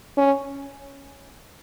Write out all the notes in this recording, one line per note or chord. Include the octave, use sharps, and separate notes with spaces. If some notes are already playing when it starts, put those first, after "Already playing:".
C#4